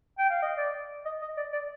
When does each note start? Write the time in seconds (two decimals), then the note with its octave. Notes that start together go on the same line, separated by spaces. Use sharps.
0.18 G5
0.30 F5
0.42 D#5
0.57 D5
1.05 D#5
1.22 D#5
1.37 D5
1.52 D5